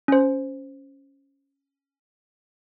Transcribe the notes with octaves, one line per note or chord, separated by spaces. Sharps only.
C#4 C5